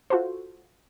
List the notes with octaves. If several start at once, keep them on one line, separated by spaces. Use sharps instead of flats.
F4 F#4 A4 C5